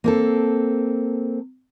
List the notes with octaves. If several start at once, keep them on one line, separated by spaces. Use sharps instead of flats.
A#3 C4 A4